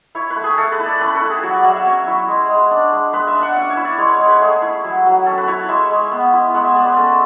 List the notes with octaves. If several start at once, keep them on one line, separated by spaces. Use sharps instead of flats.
E4 C#5
B4
A3
G#4
A3 A4
B4
E4
D5
C#4 B4
A4
E4
G#4
F#3 F#4
D5
F#3 E5
E5
C#4 C#5
E4
G#3
G#3
D4
G#3
G#3 B4
E5
D4
F#5
C#4 E5
C#5
E4
D5
G#3 C#5
C#5
G#3
B4
A3 G#4
E4
F#3
F#3
C#4 A4
B4
E4 C#5
G#3 E5
G#3
B3
E4
G#3 F#5
E5
G#3 D5
B4
C#4 A4